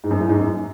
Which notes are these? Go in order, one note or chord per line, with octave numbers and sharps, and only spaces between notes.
G#2
F#2
A2
G#2
F#2